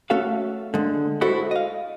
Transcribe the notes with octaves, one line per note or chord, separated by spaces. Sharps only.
A3 C#4 F#4 A4 E5 F5
D3 G#3
G#3 E4 F#4 A4 C5
D#5 F5